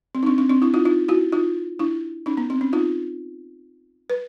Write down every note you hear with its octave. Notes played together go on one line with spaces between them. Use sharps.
C4
D#4
C4 D4
C4 D4
C4 D4
D4 E4
D#4 F4
D#4 F4
E4 F#4
D#4 F4
D4 E4
C#4 D#4
B3
C4
C#4
D#4 F4
B4